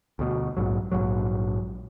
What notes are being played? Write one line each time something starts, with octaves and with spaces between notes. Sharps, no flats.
D2 B2
A#1 G#2 F#3
A#1 E2 G#2 F#3